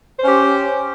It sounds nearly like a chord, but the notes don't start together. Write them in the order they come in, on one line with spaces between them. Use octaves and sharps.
C5 C#4 G4